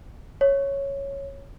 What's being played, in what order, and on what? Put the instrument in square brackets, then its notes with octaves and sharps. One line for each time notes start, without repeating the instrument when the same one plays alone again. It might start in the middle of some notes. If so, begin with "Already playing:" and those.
[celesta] C#5